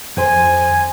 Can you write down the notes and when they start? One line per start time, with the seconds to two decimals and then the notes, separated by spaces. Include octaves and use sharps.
0.17 F2 C5 G#5 C6